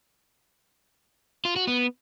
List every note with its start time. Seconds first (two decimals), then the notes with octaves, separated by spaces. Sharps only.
1.45 F4
1.56 F#4
1.67 B3